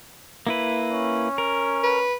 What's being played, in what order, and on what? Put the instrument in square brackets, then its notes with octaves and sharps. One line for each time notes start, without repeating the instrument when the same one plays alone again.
[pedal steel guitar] A#3 E4 B4
[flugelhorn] C#4
[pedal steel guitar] A#4
[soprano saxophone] B4